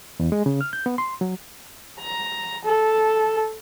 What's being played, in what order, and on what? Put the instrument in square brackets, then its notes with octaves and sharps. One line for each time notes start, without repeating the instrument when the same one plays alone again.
[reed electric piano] E2
G#3
C#3
F6
G6
B3
C6
F#3
[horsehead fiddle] A#5
A4